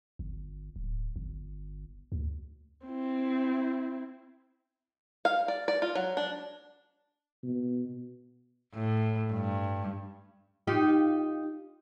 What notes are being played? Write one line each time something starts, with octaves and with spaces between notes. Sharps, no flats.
G1
D1
G1
D2
C4 E4
F5
D5
D5
F4
F#3
D4
B2
A2
G2
D#4 F4 G4